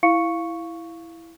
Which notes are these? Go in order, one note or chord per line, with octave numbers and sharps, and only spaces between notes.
E4 F5 C#6 C#7